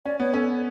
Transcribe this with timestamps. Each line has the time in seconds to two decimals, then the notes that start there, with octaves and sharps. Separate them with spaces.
0.05 C#4 D5
0.19 B3 C#5
0.33 C#4 A4